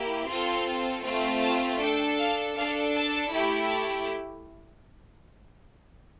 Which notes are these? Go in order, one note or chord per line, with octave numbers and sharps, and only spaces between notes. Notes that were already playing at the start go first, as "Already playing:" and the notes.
Already playing: A#3 E4 G4
C4 F4 A4 C6
A3 C4 F4
A5
D4 A4 G5
F5
D4 A4 F5
A5
A3 E4 G4
A5